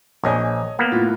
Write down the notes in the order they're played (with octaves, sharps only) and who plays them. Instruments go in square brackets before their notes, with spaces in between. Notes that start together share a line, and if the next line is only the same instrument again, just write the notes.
[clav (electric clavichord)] A#1 [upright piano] C#5 D#5 G#5
[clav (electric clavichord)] A#3 B3
[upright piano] A2 F4